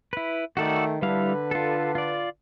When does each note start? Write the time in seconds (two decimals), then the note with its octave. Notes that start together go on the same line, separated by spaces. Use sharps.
0.13 E4 B4
0.57 D#3 A3 F#4 A4 D5
1.02 D3 G3 E4 B4 F5
1.51 F4 A4
1.95 F4 D5